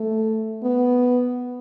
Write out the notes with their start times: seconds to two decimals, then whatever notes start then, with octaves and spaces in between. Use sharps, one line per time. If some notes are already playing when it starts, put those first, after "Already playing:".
Already playing: A3
0.63 B3